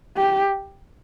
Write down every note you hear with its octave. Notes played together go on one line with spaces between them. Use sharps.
G4